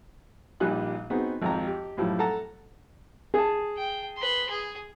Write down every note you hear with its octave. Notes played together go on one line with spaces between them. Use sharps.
A#1 A#2 G3 D#4 G#5 F#6
B3 C4 D#4 F#4 G#4
G#1 F2 A#5
G4
F#2 A2 F3 G3
A4 F#5 A5 A#5
G#4 A5
G5
B4 C6
G#4